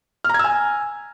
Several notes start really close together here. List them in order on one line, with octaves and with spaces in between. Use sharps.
F6 A#5 G#6 E6 G#5